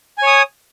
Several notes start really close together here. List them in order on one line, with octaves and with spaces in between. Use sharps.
G#5 C#5 D#6